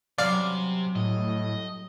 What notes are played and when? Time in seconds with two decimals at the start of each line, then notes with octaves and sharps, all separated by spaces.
0.18 C3 F#3 G3 C#4 D5 F5
0.96 A2 D#5